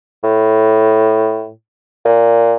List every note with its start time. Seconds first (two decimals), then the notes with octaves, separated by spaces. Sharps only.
0.24 A2
2.05 A#2